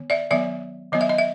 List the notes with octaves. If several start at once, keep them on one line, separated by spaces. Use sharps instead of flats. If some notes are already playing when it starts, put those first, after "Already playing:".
Already playing: D#3 B3
D5 E5
D#3 F#3 B3 D5 E5
D#3 F#3 B3 D#5
E5
D#5
E5